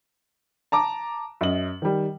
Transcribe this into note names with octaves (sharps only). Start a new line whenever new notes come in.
A5 A#5 D6
F#2 D#5 F#7
D#3 G3